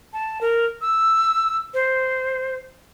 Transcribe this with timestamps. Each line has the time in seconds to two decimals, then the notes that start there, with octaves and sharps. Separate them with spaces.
0.13 A5
0.41 A#4
0.81 E6
1.74 C5